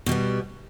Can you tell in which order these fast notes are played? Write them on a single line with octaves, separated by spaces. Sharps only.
B2 G3 B3